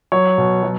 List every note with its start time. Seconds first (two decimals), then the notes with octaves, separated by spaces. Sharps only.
0.12 F#3 C#5
0.38 B2
0.63 F#3